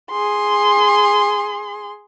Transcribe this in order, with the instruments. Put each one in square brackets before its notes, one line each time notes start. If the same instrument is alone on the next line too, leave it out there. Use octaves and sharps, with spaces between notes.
[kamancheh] G#4 C6